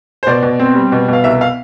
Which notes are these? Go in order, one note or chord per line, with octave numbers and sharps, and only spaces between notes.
C5
B2 D5
B2
C4
G3
B2
B2 F5
C2 E5
F5